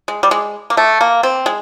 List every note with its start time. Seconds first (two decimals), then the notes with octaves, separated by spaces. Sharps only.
0.08 G#3
0.23 G3
0.31 G#3
0.70 A#3
0.77 A3
1.01 A#3
1.23 C4
1.46 G#3